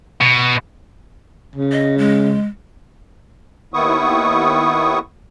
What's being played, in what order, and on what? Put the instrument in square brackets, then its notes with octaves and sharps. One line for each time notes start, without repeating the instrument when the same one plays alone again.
[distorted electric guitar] B2
[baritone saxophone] C#3
[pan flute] D#5
G#3
[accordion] D#2 D#3 B3 E4 C#6 D#6